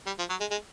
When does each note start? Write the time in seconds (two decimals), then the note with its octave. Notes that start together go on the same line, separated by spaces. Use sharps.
0.06 G3
0.19 F3
0.30 F#3
0.40 G#3
0.51 G#3